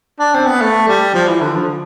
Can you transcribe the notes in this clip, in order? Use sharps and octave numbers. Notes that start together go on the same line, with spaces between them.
D4
C4
B3
A3
G3
F3
E3
D3
F3